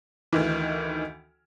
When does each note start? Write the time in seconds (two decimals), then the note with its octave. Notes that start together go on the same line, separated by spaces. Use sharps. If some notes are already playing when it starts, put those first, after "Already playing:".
0.33 D2 D#3 E3